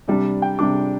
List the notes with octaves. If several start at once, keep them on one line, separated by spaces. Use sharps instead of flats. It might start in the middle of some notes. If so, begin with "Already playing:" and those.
C3 G3 D4 D5
G5
C3 G3 D4 D6